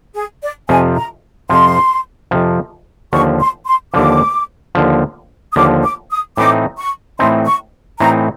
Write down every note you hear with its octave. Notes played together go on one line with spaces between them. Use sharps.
G#4
D5
F2 C3 F3 G#5
A#5
F2 C3 F3 C6
F2 C3 F3
D#2 D3 F3 C#6
C6
C6
D#2 D3 F3 D6
D#2 D3 F3
D#6
D#2 D3 F3 D6
D6
D#6
A2 E3 A3 C4 D#4 D6
C#6
A2 E3 A3 C4 D#4 C6
C#6
A2 E3 A3 C4 D#4 A#5